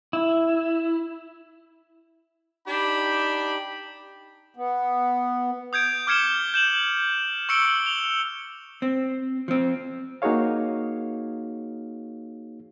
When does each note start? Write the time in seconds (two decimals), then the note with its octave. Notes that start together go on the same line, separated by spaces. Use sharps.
0.13 E4
2.67 D4 D#4 G4 G5 B5
4.56 B3
5.73 D#6 G6 G#6 D7
6.07 D6 F6 G#6 C#7 E7 G7
6.54 G6 E7 F#7
7.49 C#6 E6 C#7 D7 G7
7.86 F7 G7
8.82 C4
9.48 F3 C4
10.22 A#3 D#4 F#4 G#4 C#5 F5